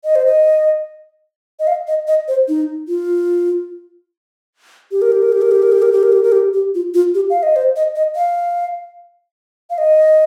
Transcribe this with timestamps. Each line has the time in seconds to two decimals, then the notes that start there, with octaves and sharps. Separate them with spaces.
0.04 D#5
0.16 C5
0.26 D#5
1.60 D#5
1.67 F5
1.87 D#5
2.07 D#5
2.28 C5
2.48 D#4
2.88 F4
4.92 G4
5.02 A#4
5.12 G4
5.22 A#4
5.32 G4
5.42 A#4
5.52 G4
5.62 A#4
5.72 G4
5.82 A#4
5.92 G4
6.03 A#4
6.12 G4
6.23 A#4
6.32 G4
6.53 G4
6.75 F4
6.94 F4
7.15 G4
7.30 F5
7.43 D#5
7.56 C5
7.76 D#5
7.96 D#5
8.16 F5
9.70 F5
9.78 D#5